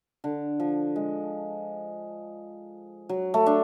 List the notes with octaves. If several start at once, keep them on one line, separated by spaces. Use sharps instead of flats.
D3
F3
G#3
F#3
A3
D4